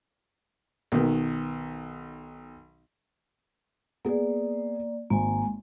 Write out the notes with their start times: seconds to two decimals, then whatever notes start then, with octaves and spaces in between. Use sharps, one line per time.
0.92 B1 D#3
4.05 A#3 B3 G#4 D5
5.10 G#1 A#3 G#5